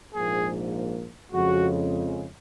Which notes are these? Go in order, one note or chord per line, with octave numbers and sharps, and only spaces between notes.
A#1 G#2 F3 A#3 G#4
F2 C#3 G#3 F#4